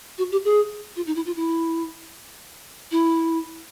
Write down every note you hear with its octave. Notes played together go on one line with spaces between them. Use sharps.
F#4
G4
G#4
F4
D#4
E4
F4
E4
E4